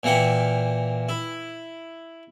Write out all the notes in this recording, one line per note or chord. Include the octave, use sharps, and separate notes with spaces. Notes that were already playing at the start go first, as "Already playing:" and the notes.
A#2 E3 A#3 F#5 G5
E4